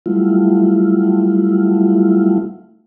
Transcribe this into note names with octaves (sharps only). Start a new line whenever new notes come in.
F#3 G3 A3 E4 F4